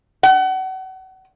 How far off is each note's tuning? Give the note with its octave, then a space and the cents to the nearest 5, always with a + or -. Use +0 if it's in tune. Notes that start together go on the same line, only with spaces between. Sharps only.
F#5 +35